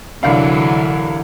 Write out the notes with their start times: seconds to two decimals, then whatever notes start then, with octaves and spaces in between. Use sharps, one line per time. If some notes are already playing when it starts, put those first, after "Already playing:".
0.23 C2 D3 E3 F#3 D4 F5